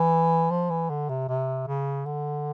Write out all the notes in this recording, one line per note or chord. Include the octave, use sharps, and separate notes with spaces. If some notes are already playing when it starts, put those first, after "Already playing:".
Already playing: E3
F3
E3
D3
C3
C3
C#3
D3